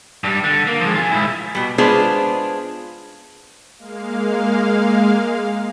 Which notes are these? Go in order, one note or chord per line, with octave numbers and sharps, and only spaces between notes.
G2 G3
D3
A#3
F3 G#3
F4 G#5
G#2 E4
B2 G3
G#3 B3 D4 F4 G#4 C5
G#3 A#3 F5